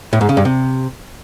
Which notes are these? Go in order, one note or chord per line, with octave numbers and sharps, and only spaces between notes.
A2
G#2
C#3
G2
C3